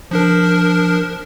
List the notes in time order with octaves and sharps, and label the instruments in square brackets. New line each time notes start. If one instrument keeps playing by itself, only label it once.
[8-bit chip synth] F3 D4 A#4